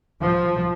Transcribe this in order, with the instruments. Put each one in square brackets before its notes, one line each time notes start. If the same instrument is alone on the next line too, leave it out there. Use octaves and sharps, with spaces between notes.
[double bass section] F3